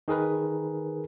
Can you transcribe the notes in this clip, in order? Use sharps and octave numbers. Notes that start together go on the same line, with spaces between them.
D#3 G#4 A#4 B4